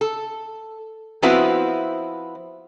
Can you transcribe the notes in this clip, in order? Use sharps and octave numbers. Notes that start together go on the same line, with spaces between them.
A4
F3 B3 C4 E4 F#4 B4